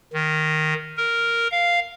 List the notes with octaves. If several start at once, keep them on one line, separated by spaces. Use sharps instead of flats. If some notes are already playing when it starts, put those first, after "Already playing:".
D#3
A#4
F5